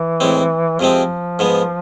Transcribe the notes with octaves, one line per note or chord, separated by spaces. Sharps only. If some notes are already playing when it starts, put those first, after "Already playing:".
Already playing: E3
A2 G#3 C4
F2 C3 F3 G#3 C4
G#2 G#3 B3